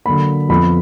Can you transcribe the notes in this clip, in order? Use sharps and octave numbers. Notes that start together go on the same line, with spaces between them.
D3 F#3 A#3 B5
F2 F3 B3 B5